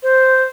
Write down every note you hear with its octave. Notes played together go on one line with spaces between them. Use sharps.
C5